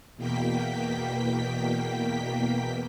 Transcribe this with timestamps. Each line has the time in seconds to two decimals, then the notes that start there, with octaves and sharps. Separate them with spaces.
0.16 E2 B2 A#3 G5 B6